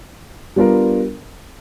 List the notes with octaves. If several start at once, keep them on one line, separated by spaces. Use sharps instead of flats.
G3 B3 D4 F4 A#4